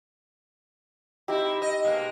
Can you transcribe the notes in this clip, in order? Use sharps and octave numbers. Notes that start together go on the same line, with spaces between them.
C4 D#4 E4 G4
D#5
B2 G#3 A#3